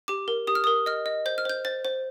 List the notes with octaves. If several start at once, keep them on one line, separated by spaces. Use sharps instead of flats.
G4 D6
A#4
G4 D#6
F6
A#4 D#6
D#5 F6
D#5
C5 G6
F6
C5 G6
C5 A6
C5